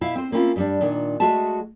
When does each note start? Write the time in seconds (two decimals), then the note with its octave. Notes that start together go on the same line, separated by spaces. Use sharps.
0.01 B2 E4 E5 F5
0.15 C4 C5
0.32 A#3 C4 C#4 E4 F4
0.56 G2 G3 D4
0.81 A#2 D#3 D4
1.20 G#3 A3 F#4 G#4 E5 A5